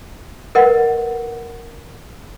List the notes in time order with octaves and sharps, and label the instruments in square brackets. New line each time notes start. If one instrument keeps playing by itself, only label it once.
[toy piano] A#4 B4 D#5 F#5